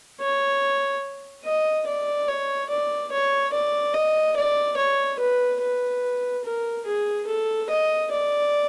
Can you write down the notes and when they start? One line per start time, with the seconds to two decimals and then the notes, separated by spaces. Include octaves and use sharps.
0.21 C#5
1.45 D#5
1.87 D5
2.28 C#5
2.70 D5
3.12 C#5
3.54 D5
3.94 D#5
4.37 D5
4.78 C#5
5.20 B4
5.61 B4
6.45 A#4
6.86 G#4
7.28 A4
7.69 D#5
8.11 D5